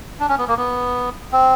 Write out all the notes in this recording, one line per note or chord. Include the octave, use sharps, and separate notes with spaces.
D4
C#4
B3
A#3
B3
C4